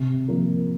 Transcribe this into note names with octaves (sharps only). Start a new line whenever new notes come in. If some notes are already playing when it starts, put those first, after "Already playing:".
Already playing: C3
F3 A#3 F4 A#4